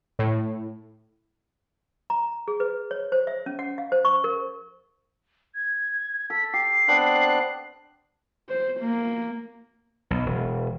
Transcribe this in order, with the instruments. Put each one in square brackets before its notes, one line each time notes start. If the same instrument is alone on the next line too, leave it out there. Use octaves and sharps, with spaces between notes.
[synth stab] A2
[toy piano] A#5
G#4
B4
C#5
C5
E5
C#4
F#5
F5
C5
C#6
A#4
[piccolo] G#6
[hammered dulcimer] A4 [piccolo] B6
[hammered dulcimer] G4 [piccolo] C7
[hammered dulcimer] B3 C4 G5 [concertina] D4 F#6
[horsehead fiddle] C5
A#3
[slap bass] B1
E1